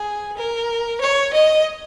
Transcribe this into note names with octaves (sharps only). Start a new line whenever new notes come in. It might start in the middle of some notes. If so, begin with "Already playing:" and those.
Already playing: G#4
A#4
C#5
D#5